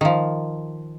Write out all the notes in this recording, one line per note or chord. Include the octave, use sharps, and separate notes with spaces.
D#3 F3